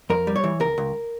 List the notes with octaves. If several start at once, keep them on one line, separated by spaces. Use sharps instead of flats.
F2 A#4
G3
C#5
E3
C#2 A#4
C#2